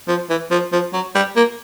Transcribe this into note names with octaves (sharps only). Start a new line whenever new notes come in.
F3
E3
F3
F3
F#3
G3
A#3